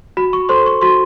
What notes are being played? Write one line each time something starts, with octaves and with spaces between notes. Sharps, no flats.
F#4 B5
C#6
A4 C5 C6
C#6
F#4 C6